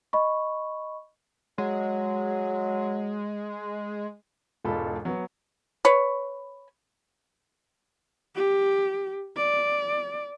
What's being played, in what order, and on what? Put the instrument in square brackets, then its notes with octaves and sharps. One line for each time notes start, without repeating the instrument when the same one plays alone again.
[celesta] D#5 B5 C#6
[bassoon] F#3 [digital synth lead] G#3
[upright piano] E1 G#2 B2 F4 A4 B5
F#3 B3
[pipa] B4 C#5
[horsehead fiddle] G4
D5